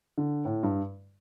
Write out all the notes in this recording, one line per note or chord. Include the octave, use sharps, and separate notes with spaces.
D3
A2
G2